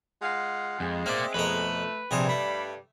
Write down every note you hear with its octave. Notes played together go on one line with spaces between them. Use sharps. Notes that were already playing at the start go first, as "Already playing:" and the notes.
G#3 F4 F5 F#5
F2 G#3
A#3 C4 D5 E5
F2 B2 A3 A#4 B4
A#1 G2 C3 G3 C4 G#4
A3 B5